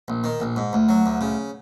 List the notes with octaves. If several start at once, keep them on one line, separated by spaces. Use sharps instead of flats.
A#1
D#3
A#1
G#2
D2
F#3
D2
C#3